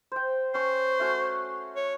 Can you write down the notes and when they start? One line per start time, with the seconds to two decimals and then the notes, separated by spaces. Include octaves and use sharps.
0.12 C5 G5
0.54 C#4 C5 C#6
0.99 A3 C#4 F#4
1.76 C#5